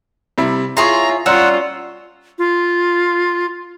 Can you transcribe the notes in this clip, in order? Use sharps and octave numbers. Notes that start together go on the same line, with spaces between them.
C3 G3 E4
E4 F4 G#4 C#5 A#5 C6 C7
G3 C#4 F4 C#5 F#5 A#5 C6 E6
F4